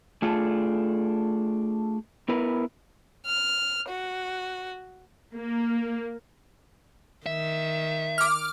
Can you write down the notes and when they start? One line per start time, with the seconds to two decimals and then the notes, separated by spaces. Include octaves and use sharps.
0.22 A3 D4 F4 G#4 A4
2.28 B3 E4 A#4 B4
3.26 F6
3.88 F#4
5.35 A#3
7.26 D#3 E5
8.18 D6 F6